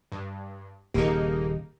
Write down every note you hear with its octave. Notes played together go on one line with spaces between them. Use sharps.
G2
D#1 C#3 A#3 D#4 G4 G#4